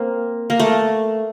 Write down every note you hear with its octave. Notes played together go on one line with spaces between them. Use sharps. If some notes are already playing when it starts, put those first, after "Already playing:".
Already playing: A#3 C4
A#3
A3